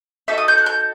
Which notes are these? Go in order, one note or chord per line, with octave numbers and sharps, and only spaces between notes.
D#4 F#4 A4 E5
D#6
G6
F#6
G6